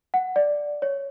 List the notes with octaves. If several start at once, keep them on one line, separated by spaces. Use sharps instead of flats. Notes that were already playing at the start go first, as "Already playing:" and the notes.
F#5
D5
C#5